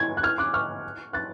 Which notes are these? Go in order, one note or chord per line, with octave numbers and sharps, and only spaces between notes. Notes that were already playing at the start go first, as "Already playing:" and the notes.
Already playing: G#6
F#6
F6 G#6
D6 F#6
C#6 F6
F#6 A6